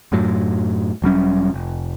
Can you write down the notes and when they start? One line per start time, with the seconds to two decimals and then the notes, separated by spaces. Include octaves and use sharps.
0.12 F#2 A2 F#3
1.02 E1 F#3 G3 C#4
1.54 F1